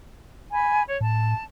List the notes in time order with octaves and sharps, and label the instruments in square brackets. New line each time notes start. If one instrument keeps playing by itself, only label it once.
[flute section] G#5 B5
C#5
[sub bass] A2 [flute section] A5